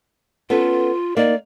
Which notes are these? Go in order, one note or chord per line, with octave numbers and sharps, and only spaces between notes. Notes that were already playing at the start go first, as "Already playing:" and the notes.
B3 C#4 F4 A4
A#3 D#4 D5